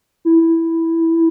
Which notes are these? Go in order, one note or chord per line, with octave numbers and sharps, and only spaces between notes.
E4